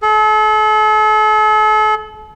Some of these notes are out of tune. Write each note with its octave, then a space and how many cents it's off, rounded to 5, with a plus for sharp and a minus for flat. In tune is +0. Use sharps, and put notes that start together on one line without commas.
A4 -40